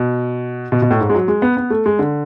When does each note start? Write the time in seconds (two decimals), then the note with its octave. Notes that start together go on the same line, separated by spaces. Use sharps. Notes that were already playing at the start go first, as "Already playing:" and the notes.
Already playing: B2
0.72 B2
0.82 B2
0.91 A2
1.01 G#2
1.10 G#3
1.15 F#3
1.28 G#3
1.42 B3
1.57 B3
1.70 A3
1.86 G#3
1.99 D3